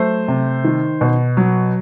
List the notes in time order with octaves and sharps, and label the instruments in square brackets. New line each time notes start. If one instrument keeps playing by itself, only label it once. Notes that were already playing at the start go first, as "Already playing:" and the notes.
Already playing: [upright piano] F#3 A3 [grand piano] C5
[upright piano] C3
D#3
B2
F#3